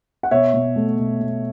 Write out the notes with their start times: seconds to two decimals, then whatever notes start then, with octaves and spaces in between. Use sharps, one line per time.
0.23 F#5
0.31 B2 C#5 E5
0.54 B2
0.76 A3
0.98 B2
1.20 B2